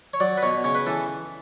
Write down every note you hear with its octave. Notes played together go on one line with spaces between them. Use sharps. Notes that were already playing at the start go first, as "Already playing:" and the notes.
C#5
F#3 D5
B4
B2 C#5
C#3 C#5
B4
E3 A4